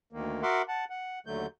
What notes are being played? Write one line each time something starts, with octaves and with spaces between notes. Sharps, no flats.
D2 D#3 A#3
F#4 A#4 E5 F#5 C6 D6
F#5 A5
F#5
D#2 D3 F#3 A3 G6